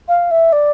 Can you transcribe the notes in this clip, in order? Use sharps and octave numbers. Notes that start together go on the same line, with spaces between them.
F5
E5
D5